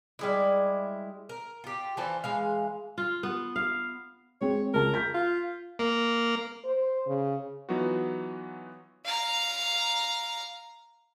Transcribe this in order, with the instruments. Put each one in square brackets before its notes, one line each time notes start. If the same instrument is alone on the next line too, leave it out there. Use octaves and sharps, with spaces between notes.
[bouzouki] G3 G#3 E4
A#4
F4 G4
E3 F4 A4 C5
E3 G#3 F5
[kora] F4
B3
F5
[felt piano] G#3 C4 G#4 [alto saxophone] C#5
[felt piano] C#2 G#3 A5 [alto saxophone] A#4
[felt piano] G6 B6
[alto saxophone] F4
[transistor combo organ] A#3
[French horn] C5
C#3
[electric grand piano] E3 F#3 B3 D#4 F4 F#4
[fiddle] F5 A#5